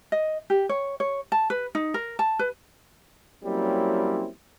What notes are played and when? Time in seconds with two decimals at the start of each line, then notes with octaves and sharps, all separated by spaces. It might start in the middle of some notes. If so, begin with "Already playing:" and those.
0.12 D#5
0.50 G4
0.69 C#5
1.00 C#5
1.32 A5
1.50 B4
1.75 D#4
1.94 A#4
2.19 A5
2.39 B4
3.44 F#3 G3 A#3 C4 C#4 E4